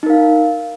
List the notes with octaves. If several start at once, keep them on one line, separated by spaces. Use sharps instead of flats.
D#4 A#4 F5